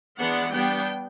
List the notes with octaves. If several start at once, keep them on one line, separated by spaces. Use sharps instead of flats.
E3 G#3 B3 D4 F#5
G3 B3 D4 G5